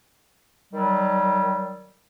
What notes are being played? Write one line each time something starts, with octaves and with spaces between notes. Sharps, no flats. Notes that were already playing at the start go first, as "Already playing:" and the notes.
D#3 F#3 G3